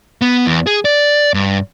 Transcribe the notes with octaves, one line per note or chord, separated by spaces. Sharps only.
B3
E2
G#4
D5
G2